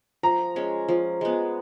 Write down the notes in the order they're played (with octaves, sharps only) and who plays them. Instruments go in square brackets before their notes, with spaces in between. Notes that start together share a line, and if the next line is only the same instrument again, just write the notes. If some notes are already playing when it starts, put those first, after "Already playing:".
[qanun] F3 [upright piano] A#5
[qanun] G#3 C#4
F3
G#3 B3